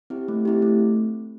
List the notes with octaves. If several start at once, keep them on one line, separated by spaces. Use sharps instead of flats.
C4 E4 G4
A3
C4 E4 G4
A3